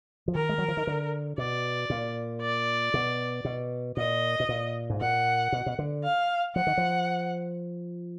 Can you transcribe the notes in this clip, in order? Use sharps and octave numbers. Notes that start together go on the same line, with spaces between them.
F3
D#3 A#4
G#3
F#3
F3
D#3
D3
B2 D5
A#2
D5
B2
B2
A#2 D#5
B2
A#2
G#2
A#2 F#5
B2
B2
D3
F5
F3 F#5
D#3
F3